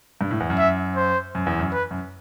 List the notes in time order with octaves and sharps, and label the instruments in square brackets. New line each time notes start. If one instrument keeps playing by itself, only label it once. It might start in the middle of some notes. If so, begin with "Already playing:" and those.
[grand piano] G2
A2
E2
F#2
[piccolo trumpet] E5
C5
[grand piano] F#2
E2
F#2
[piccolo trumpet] B4
[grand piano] F#2